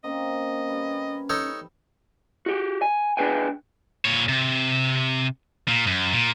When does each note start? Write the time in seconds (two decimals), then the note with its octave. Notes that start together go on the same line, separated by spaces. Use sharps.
0.04 A#3 C4 C#4 D#5
0.68 G3 B4
1.30 D#4 A4 C#5
2.46 F#4 G4
2.82 G#5
3.17 D4 G#4 B4 G5 G#5
4.05 A#2 C#5
4.29 C3
5.68 A#2
5.87 F#2
6.13 A#2